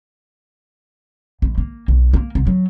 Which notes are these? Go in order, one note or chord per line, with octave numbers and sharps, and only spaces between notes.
A#1
A#3
B1
A#3
C2
F#3